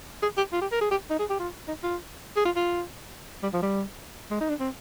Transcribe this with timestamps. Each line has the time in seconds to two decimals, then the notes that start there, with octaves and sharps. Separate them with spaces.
0.22 G#4
0.37 G4
0.52 F4
0.61 G4
0.72 A#4
0.81 G#4
0.91 G4
1.10 D#4
1.20 G#4
1.30 G4
1.39 F4
1.68 D#4
1.83 F4
2.36 G#4
2.45 F4
2.56 F4
3.43 G3
3.53 F3
3.62 G3
4.31 G#3
4.41 D#4
4.49 D4
4.60 C4